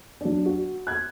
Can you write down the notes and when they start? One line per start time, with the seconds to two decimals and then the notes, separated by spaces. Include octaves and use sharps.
0.21 F#3 D4
0.46 F#4
0.87 F#6 G#6